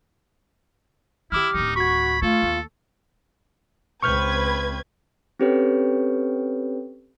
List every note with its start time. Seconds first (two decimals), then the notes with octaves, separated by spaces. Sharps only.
1.32 D#3 D#4 E4 G4 D6 F6
1.55 D1 D#3 D#4
1.76 F#4 B5 C#6 G#6
2.22 A3 F4 A4
2.43 D#2
4.03 C#2 C4 B4 C#6 F6 G6 G#6
5.40 C4 C#4 G4 A4 B4 C#5